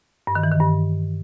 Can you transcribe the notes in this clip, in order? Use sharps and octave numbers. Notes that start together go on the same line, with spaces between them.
G2
D#3
E3
D#3
G2